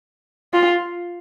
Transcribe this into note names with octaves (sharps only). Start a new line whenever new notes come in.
F4